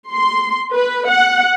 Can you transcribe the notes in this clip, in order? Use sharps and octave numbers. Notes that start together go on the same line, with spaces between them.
C6
B4
F#5